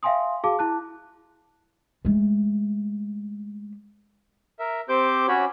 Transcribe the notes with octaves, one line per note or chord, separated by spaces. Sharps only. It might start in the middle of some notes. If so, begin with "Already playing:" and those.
E5 F5 G5 G#5 C6 D#6
F#4 G#4 F5 A5 D6
E4 A5 F#6
G#3 A3
A#4 E5
C4 G4 C5 D6 G6
C#4 F#4 C#5 B5